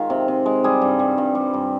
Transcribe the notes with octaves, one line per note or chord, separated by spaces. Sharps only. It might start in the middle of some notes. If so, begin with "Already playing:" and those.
Already playing: D#3 G#3 F4
C3
C3
G#3
G3 G#4
G2
G3
G2
G3
G2